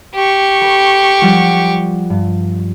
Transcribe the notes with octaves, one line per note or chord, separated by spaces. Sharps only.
G4 C#6
A4 B4
F3 G3 F#5
G2